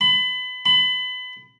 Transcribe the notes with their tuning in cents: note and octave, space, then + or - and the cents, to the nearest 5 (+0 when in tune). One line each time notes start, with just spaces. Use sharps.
B5 +30
B5 +30